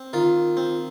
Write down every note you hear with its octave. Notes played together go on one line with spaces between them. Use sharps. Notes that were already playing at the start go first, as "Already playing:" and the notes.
Already playing: C4
D#3 F4
C4